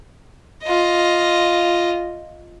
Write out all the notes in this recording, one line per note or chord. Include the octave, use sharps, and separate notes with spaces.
F4 D#5